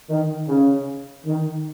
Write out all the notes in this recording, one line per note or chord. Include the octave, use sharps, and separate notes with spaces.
D#3
C#3
D#3